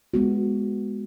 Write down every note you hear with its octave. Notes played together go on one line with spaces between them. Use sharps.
G#3 B3 F#4